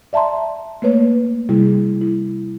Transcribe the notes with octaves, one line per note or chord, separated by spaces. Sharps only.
D5 E5 A5 A#5 C6
A3 A#3 B4 C#5
C3 G3 E4 G#4
E4